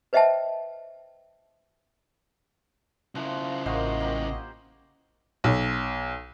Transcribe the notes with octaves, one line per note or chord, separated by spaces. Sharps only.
B4 C5 D#5 E5 G5 A5
C#3 F3 E4 F#4
A1 A#3 C5 D#5 F#5 C6 C#6
A#3 G4
B1